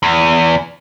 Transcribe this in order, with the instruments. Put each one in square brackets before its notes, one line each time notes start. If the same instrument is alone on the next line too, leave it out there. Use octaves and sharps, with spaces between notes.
[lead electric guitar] E2